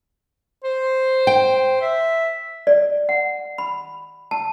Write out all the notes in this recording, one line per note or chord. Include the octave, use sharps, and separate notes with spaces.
C5
G5
E5
D5
F#5
B5
A5